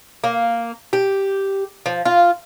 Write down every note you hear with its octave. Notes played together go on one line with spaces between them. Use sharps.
A#3
G4
F3
F4